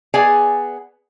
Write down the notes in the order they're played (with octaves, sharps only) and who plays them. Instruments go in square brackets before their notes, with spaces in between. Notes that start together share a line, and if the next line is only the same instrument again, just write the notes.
[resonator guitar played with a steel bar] B3 G#4 D5 G#5